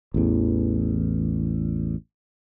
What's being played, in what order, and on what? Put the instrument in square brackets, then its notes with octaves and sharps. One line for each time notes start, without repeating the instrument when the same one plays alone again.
[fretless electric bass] A1 E2